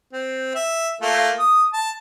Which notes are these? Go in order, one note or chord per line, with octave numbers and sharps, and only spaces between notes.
C4
E5
A3 A#3 F4
D#6
A5